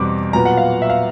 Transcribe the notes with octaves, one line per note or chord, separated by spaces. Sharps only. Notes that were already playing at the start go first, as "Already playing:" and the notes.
Already playing: E2 B2 G3 C4 D6
A#2 F#3 B3 A#5
F#5
F5
E5
F5